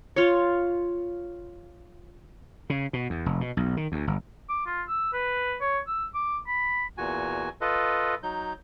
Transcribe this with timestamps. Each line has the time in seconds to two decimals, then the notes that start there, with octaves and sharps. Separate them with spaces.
0.16 F4 C#5
2.70 C#3
2.93 B2
3.10 E2
3.26 F1
3.41 B2
3.57 B1
3.77 D#3
3.92 D2
4.07 G1
4.50 D6
4.66 F4
4.88 E6
5.13 B4
5.61 C#5
5.87 E6
6.14 D6
6.48 B5
6.98 E2 A#2 F#4 G#5
7.61 F4 A4 B4 D#5
8.23 F#3 D#4 G6